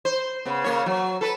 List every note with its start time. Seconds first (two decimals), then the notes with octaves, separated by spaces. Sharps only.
0.05 C5
0.45 C#3 B3
0.64 C#3 A#3 C#5
0.86 F#3
1.21 A4 B4